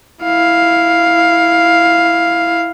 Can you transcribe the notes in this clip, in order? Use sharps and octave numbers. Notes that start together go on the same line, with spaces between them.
E4 F5